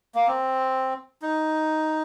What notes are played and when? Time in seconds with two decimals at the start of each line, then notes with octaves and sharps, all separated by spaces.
0.15 A#3
0.27 C4
1.22 D#4